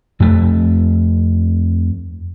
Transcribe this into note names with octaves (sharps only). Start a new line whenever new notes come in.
F2 A3